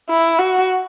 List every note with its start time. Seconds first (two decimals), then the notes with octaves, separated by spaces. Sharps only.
0.10 E4
0.39 F#4